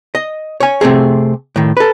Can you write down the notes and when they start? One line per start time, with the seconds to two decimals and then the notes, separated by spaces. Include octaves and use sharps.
0.15 D#5
0.60 C#5 G#5
0.81 C3 A3 C4 G#4
1.56 A2 D#3
1.77 A4 B4